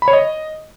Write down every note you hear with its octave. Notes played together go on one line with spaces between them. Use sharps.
B5
C#5
D#5